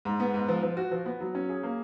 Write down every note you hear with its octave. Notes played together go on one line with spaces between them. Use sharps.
G#2
B3
G#2
F3
F3
F#4
F3
B3
F#3
C#4
G#4
A#3